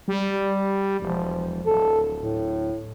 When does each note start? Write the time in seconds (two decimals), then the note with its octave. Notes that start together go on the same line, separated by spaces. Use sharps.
0.08 G3
1.00 E1 F3
1.66 D1 A4
2.21 A2